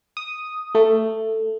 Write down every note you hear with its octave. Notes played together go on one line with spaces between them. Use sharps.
D#6
A3